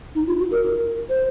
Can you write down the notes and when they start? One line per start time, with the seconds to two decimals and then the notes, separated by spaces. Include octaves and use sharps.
0.15 D#4
0.27 F4
0.39 F#4
0.51 A#4
1.09 C5